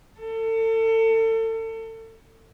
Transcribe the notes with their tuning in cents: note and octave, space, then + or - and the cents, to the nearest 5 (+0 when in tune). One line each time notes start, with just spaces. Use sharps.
A4 +35